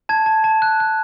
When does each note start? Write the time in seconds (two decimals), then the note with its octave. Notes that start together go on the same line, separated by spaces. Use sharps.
0.09 A5 G#6
0.26 A5
0.44 A5
0.62 F#6
0.80 F#6